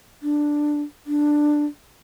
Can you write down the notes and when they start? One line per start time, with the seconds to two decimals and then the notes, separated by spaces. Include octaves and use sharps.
0.23 D4
1.07 D4